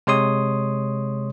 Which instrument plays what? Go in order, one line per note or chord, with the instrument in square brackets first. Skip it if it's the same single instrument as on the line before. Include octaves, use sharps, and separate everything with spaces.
[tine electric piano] C3 G#3 C#5 C6 D#6